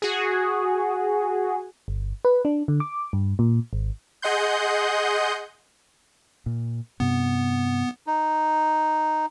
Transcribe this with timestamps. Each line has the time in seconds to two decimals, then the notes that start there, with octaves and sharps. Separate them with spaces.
0.02 F#4 G#4
1.88 G1
2.25 B4
2.45 D4
2.68 D3
2.80 D6
3.13 G2
3.39 A#2
3.73 G#1
4.22 G#4 D#5 F#5 C6 G6
6.46 A#2
7.00 G2 C3 B3
8.07 D#4